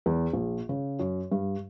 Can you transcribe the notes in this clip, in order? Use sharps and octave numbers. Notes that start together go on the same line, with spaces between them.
E2
A#1
C#3
F#2
G2